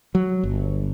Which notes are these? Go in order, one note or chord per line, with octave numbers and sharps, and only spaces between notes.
F#3
G1